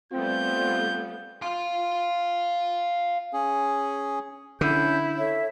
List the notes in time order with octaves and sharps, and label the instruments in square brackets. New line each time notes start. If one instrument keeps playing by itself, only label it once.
[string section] G3 A3 B3 [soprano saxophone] C4 [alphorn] F4 [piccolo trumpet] G6
[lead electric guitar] F5 C6
[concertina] C#4 G#4
[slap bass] D3 [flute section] C#4 G6 [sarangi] E4
[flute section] A4 C#5 E5